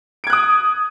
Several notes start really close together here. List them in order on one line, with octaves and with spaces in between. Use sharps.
D7 G#6 F#6 D#6